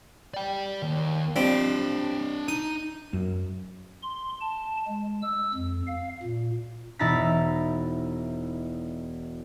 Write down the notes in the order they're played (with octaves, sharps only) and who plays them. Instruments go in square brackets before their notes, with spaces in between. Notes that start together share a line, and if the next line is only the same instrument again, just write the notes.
[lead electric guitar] D5 G5
D#2
[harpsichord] F3 G3 C4 [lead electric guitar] D4 D#5
[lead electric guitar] D#4 [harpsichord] D#6
[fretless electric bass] F#2
[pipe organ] C6
A5
G#3
E6
F2
F5
A#2
[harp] E1 D#4 E4 A#5 A6 B6